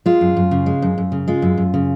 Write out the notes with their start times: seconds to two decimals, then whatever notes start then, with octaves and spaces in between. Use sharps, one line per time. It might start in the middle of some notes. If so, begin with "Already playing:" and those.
0.06 G#3 F4
0.21 F#2
0.37 F#2
0.51 C#3
0.66 G#3
0.82 F#2
0.98 F#2
1.12 C#3
1.28 G#3 F4
1.42 F#2
1.57 F#2
1.74 C#3